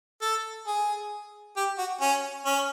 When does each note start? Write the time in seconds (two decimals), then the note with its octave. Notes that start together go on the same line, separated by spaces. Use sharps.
0.22 A4
0.67 G#4
1.57 G4
1.78 F#4
2.01 C#4
2.46 C#4